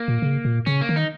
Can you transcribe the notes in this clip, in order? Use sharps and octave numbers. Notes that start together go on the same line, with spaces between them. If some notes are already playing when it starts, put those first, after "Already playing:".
Already playing: A#3
A#2
C#3
A#2
C#3 C#4
A#3
D#3
D#4